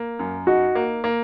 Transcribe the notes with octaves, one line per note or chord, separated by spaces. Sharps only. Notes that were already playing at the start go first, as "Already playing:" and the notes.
Already playing: A#3
F#2
D#4 F#4
A#3
A#3